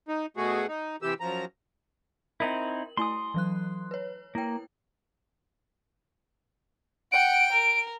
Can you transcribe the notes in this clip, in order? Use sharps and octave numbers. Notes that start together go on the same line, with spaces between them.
D#4
B2 A3 F#4 G#4
D#4
C3 E3 G4 E6
F#2 F3 A#5
C4 D#4 E4 A#4 F#7
A3 E4 G#5 C6 D#6
E3 F#3 F#6
B4 C#5
A#3 E4 G5
F#5 G5 D7
A#4